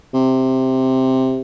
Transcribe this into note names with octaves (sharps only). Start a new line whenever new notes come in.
C3